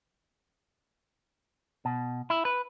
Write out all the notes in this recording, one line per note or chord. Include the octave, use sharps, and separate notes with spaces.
B2
E4
B4